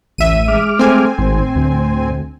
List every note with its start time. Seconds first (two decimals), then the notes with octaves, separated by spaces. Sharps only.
0.18 A1 D2 E5 D#7
0.48 G#3 D6 F6
0.79 A3 C4 G#5
1.18 G#1 A2 C5
1.55 D2